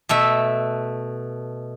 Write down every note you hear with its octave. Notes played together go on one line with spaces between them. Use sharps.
B2 A3 E5